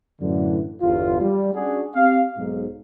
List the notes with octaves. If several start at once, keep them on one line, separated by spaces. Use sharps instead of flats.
F#2 A2 D3 E3
G1 E2 F4
G3
C#4 D4 F#4 G#4
C4 G4 F5
B1 G#2